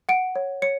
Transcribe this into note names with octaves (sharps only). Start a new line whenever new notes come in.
F#5 D7
C#5
C#5 C#7